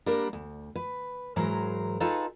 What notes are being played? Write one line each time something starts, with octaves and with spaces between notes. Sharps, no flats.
G3 A#3 D4 A#4
D2
B4
G#2 E3 F#3 A#4 C5
D#4 F4 G#4 A4 B4